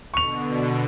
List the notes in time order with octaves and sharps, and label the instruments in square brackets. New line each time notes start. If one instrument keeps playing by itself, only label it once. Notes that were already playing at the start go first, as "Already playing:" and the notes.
[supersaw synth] B2 D3 [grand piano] C#6 F7